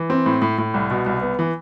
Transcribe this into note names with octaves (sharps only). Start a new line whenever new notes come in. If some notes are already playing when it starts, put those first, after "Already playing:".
Already playing: E3
C4
A2
A2
A2
C2
B2
C2
B3
E3